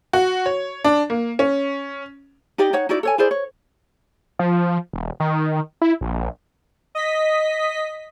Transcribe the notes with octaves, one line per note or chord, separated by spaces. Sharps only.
F#4
C#5
D4
A#3
C#4
D#4 G4 D5 D#5
D#4 C#5 F#5
D#4 E4 F#4 D5
A4 C#5 G#5
E4 G#4 C5 D5
C#5
F3
E1
D#3
E4
A#1
D#5 B6